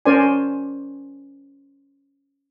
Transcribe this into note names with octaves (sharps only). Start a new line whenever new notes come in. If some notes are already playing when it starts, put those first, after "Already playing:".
C#4 A#4 C5 D5 G#5